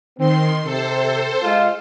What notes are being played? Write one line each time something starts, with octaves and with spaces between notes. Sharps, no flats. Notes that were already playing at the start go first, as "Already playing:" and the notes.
D#3 C4 C6
C3 A4 C5
G#3 F4